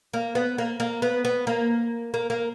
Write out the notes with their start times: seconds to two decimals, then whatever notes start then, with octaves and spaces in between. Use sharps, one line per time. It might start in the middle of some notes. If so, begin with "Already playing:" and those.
0.13 A#3
0.35 B3
0.58 A#3
0.80 A#3
1.02 B3
1.25 B3
1.47 A#3
2.14 A#3
2.30 A#3